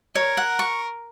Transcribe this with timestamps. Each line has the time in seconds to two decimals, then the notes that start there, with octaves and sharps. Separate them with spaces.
0.15 A#4 C#5
0.37 F#5
0.59 C#6